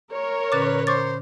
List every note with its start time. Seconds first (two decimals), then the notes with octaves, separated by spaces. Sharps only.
0.12 A#4 C#5
0.52 A#2 D3 C#4 B4 D6 A6
0.87 C5 C#6 D6 A6